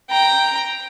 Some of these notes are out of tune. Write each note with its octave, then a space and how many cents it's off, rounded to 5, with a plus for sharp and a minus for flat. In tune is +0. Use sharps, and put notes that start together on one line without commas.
G5 +0 A#5 +0